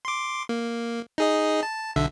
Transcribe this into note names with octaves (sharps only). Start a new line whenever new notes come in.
C6 D6
A#3
D#4 G#4 D#5
A5
B1 D3 E5